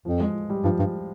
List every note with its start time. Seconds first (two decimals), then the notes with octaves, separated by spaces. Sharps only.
0.05 F2 F3
0.20 G#3
0.50 G3
0.64 G2 F3
0.79 G2